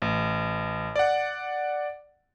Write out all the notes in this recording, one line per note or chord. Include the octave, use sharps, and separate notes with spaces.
A1
D5 F#5